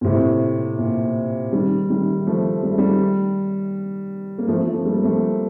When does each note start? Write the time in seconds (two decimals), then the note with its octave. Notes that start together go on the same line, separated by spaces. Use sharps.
0.01 A#2
0.04 A2 C3
0.79 A#2
1.53 D#3 G3
1.90 D#3 G3
2.27 F3 A3
2.63 G3
2.71 A3
2.78 D#3 G3
4.38 A#3
4.47 F3 A3
4.67 F3 A3
4.84 G3 A#3
5.03 F3 A3